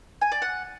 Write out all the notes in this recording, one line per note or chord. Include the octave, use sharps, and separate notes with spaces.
G#5
D5
F#5